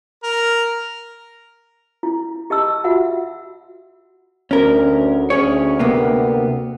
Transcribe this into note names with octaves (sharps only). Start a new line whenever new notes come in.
A#4
E4
G4 D#5 A5 E6
F4 F#4 E5 F#5
D2 C#4 A#4
D2 C#4 G#4 C#5
C3 A#3 B3